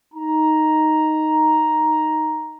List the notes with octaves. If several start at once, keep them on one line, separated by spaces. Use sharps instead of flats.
D#4 A#5